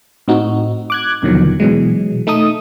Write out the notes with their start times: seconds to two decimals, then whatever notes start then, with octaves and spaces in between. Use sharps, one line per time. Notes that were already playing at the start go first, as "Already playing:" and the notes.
0.28 A2 C4 D#4 F#4
0.90 D6 F#6 G#6
1.22 D#2 B2 D3 D#3 F3 F#3
1.60 B2 E3 F#3 G#3
2.27 A3 D#4 A4 D#6